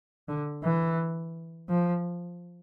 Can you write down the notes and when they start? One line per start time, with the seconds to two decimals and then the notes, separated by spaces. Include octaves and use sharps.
0.29 D3
0.64 E3
1.69 F3